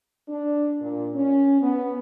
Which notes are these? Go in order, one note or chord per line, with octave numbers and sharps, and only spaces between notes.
D4
A#2
C#4
B3